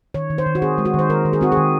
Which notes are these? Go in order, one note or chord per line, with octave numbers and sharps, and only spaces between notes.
D#3 C#5
D#3
C5
D#3
F#4
C4 G#4
G#3
F#4
D#3
C5
D#3 A#4
D#3
G#4
C4 F#4
G#4
D#3